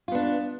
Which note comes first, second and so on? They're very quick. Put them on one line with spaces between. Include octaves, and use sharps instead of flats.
F4 B3 D4